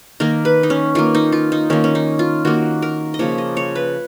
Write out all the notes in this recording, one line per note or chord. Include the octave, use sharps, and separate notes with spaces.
D#3 A#3 A#4
B4
D#4
C#4
D#3 A#3 F4
D#4
F4
D#4
D#3 A#3 C#4
C#4
D#4
F4
D#3 A#3 F#4
A#4
D#5
C#3 F3 A#3 C#5
D#5
C#5
B4